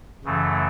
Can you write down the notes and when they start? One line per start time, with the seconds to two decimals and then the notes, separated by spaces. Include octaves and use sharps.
0.24 F#2 C#3 E3 A3